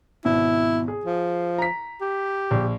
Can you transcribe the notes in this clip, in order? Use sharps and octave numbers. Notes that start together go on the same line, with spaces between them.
G#1 B2 E4
G#4
F3
A#5 B6
G4
A#1